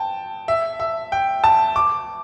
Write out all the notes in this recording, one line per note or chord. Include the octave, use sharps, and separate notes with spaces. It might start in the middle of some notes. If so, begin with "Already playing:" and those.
Already playing: G5 A5
E5
E5
G5
A5
D6